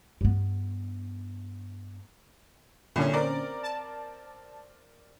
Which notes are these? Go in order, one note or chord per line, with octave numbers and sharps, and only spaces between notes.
G2 B3
C2 A#2 D3 C#4
C4 A#4 D5
A5